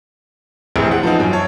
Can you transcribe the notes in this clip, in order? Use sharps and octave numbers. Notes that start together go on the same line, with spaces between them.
F1 A#1 E3 C4
F#5
F3 B3 D#4
F#2
C#5 A5